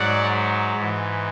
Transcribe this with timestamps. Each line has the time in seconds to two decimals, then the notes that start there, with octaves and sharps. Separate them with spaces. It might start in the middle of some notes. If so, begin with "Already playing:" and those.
Already playing: G#2 F#3 D5 F#5
0.77 G#2 E3